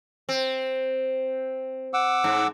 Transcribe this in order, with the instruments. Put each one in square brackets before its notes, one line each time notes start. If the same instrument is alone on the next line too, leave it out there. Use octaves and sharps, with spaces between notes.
[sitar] C4
[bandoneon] F#5 D6 E6
[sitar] G#2